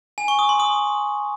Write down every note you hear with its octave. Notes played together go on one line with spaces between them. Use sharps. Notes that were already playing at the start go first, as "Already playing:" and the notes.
G#5
C#6
D#6
C6
D#6